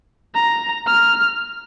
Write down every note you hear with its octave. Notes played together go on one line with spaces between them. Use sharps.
A#5
F6